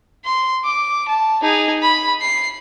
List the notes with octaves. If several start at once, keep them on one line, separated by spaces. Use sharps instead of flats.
C6
D6
A5
D#4 G#4
B5
C7